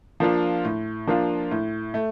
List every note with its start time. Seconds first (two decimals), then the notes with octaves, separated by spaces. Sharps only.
0.20 F3 A#3 D4 F4
0.65 A2
1.07 F3 A#3 D4 F4
1.51 A2
1.94 A3